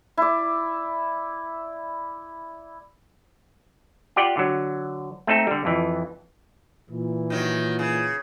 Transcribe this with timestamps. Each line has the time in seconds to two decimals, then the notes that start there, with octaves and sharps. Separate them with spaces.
0.17 E4 D5
4.16 F4 G4 D5 F#5 G5
4.37 D3 F#3
5.27 A3 C4 D#4 A4
5.47 D3 G3
5.65 F2 E3
6.90 A#2 E3
7.30 D#3 F#3
7.79 C#3